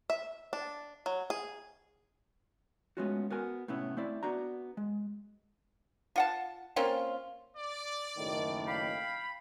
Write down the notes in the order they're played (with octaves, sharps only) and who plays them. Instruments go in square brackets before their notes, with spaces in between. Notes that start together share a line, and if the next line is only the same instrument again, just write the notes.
[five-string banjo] E5
D4
F#3
G#4
[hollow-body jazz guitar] G#3 A3 B3 C#4 F4 F#4
B3 F#4 A#4 G#5
A2 C3 B3 C#4 E4
A3 C4 E4 D5
B3 D4 F#4 A#5
G#3
[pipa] F4 F#5 A5
A#3 C4 C#4 F4
[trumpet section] D5
[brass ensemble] F#1 A2 D#3
[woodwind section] F5 G5 B5